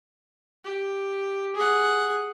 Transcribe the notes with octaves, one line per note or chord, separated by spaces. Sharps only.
G4
G#4 F#5